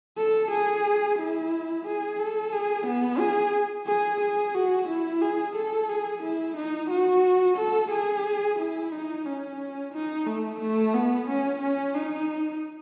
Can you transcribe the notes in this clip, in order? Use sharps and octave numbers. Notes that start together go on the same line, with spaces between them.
A4
G#4
E4
G#4
A4
G#4
B3
G#4
G#4
G#4
F#4
E4
G#4
A4
G#4
E4
D#4
F#4
A4
G#4
E4
D#4
C#4
D#4
A3
A3
B3
C#4
C#4
D#4